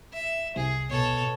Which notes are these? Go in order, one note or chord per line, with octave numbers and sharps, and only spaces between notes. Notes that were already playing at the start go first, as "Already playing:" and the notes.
E5
C2 G#4
B2 A4 C#5